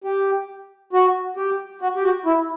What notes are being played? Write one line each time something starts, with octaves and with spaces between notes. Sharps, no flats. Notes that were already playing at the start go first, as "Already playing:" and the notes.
G4
F#4
G4
F#4
G4
F#4
E4